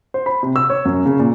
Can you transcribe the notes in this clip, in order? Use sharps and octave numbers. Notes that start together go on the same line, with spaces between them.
C5
B5
C3
E6
C#5
F#2
C#3
A#2